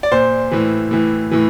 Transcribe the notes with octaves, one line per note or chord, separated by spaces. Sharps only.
D5
A#2 C5
A2 E3
A2 E3
A2 E3